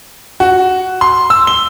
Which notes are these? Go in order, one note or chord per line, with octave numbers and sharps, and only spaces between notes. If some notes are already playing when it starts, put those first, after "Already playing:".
F#4
C6
E6
G7